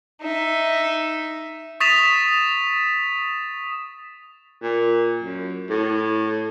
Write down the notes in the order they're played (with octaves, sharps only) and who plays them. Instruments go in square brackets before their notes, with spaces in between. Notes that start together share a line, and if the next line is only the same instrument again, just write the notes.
[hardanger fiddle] D#4 E5
[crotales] C#6 D#6 A6 B6 E7 F7
[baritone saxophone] A#2
F#2
A2